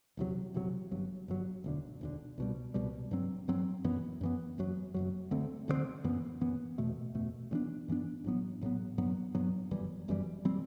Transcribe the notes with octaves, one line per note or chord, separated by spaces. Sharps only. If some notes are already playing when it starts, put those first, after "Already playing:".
E1 E2 C3 F#3
E1 E2 C3 F#3
G1 G2 F#3
G1 G2 F#3
E1 D2 D3
E1 D2 D3
C2 B2 G3
C2 B2 G3
G2 F#3 C4
G2 F#3 C4
F#2 E3 B3
F#2 E3 B3
F#1 F#2 F#3
F#1 F#2 F#3
D2 D3 A3 C4
D2 D3 A3 C4
F#2 E3 B3
F#2 E3 B3
F#1 E2 B2 A3
F#1 E2 B2 A3
G2 E3 B3 D4
G2 E3 B3 D4
A1 A2 F#3 B3
A1 A2 F#3 B3
G2 F#3 B3
G2 F#3 B3
G1 F#2 E3 G3
G1 F#2 E3 G3
E3 G3 C4